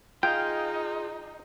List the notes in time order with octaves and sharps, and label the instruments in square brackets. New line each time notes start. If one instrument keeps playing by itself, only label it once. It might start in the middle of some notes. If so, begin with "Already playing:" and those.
[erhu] D#4 [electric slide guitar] F4 G#4 F5 [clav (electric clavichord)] G5